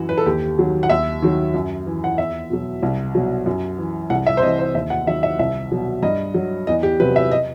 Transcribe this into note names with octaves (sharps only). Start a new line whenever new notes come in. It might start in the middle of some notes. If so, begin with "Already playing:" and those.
Already playing: F#2 E3 F#4
B4
A4
D#2 G4
D#3 F#3
F#5
D#2 E5
D#3 F#3
F#2
E3
F#5
E2 E5
B2 F#3
C2
B2 F#3
F#2
E3
C2 F#5
E5
C5
C3 E3 D#5
C5
D#2 E5
F#5
D#3 F#3 E5
E5
C2 E5
B2 F#3
G2 D#5
F#3
E2 D#5
G4
C3 F#3 B4
E5
D#5